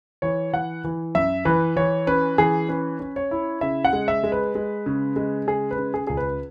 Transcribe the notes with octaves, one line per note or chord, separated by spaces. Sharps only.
E3 C#5
E3 F#5
E3
F#2 E5
E3 B4
E3 C#5
C#4 B4
E3 G#4
C#4 B4
C#4
C#5
E4
C#3 E5
F#5
G#3
E5
G#3
B4
G#3
C#3
G#3
C#3 G#4
B4
C#3
G#4
C#2 G#4
B4